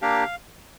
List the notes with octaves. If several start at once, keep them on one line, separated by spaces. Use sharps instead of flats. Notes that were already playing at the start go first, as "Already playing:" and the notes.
A#3 D4 G4 F5